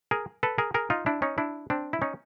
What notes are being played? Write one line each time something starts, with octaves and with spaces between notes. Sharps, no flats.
G#4 A#4
A4 B4
G#4 A#4
G#4 A#4
D#4 F4
D4 E4
C#4 D#4
D4 E4
C4 D4
E4
C#4 D#4